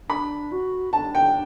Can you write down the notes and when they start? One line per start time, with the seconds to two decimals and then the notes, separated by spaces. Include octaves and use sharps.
0.09 D4 B5
0.52 F#4
0.93 D4 A5
1.15 G5